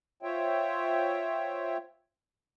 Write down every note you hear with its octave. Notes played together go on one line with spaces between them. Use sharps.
F4 C5 C#5 E5 G5